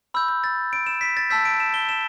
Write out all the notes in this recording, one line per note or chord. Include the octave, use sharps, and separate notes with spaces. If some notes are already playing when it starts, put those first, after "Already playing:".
B5 E6 G6
G6
A6
D7
E7
B6
A6
A5 E6 G6 B6
D7
E7
G7
E7